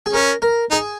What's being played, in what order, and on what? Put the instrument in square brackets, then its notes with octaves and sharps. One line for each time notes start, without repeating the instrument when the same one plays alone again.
[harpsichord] G#4
[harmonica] C#4 [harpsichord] A#4
[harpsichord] A#4
[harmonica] D#4 [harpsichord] G#4